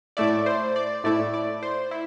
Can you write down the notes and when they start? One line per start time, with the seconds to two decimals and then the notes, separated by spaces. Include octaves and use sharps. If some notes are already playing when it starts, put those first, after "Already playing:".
0.17 A2 A3 E4 D5
0.46 C5
0.76 D5
1.04 A2 A3 E4 D5
1.34 D5
1.63 C5
1.91 E4